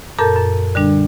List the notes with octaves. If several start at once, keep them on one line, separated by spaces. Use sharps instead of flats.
F#2 A#2 A4 A#4 A5 G6
F#2
D3 G3 D4